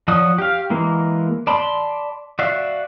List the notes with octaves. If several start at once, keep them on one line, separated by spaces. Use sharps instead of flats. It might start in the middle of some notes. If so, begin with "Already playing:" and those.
F3 F#3 F#4 D5 D#6
G4 F5
E3 G#3 A#3
D5 A5 B5 C6
F#4 D5 E5 F5